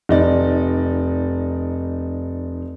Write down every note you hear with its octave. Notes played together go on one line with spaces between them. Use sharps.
F1 D#4 D5